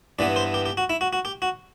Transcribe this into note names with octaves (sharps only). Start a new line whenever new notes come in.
G2 E3 B3 D5
C5
G4
G4
F#4
E4
F#4
F#4
G4
F#4